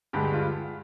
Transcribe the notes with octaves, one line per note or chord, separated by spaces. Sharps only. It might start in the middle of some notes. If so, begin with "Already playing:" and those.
G2 D3 G#3 G4
G4
F4